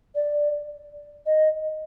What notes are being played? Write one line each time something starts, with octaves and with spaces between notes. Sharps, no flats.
D5
D#5